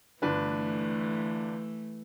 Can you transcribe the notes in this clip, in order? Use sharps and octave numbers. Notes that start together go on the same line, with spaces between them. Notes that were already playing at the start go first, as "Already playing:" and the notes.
G1 E3 A3 D4 B4